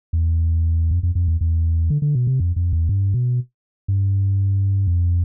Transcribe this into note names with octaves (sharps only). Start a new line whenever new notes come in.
E2
F2
F2
F2
E2
E2
D3
D3
B2
C3
F2
F2
E2
G2
B2
G2
F2